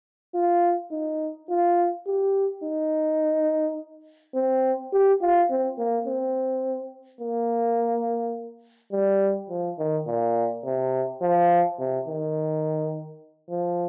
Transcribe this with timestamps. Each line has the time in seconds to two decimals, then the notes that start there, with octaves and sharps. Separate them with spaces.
0.34 F4
0.91 D#4
1.50 F4
2.07 G4
2.64 D#4
4.34 C4
4.93 G4
5.21 F4
5.50 C4
5.78 A#3
6.07 C4
7.20 A#3
8.92 G3
9.50 F3
9.79 D#3
10.07 A#2
10.64 C3
11.21 F3
11.79 C3
12.08 D#3
13.49 F3